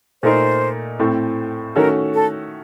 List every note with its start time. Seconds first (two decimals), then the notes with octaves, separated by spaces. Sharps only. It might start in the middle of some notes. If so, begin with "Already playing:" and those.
0.23 A#2 A3 D#4 A#4 C5
0.99 A2 A3 C4
1.76 D#3 A3 C#4 F#4 A4 A#4
2.14 A4